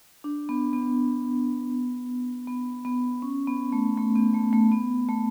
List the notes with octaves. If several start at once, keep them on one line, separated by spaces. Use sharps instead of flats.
D4
B3
B3
B3
B3
C#4
B3
A3
A3
B3
A3
A3
B3
A3